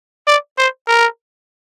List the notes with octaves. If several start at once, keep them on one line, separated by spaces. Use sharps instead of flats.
D5
C5
A#4